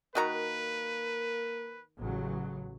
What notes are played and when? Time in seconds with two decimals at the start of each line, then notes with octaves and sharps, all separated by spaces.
0.15 D#3 A#3 F#4 A#4 B4 A#5
1.99 A1 C#3 F#3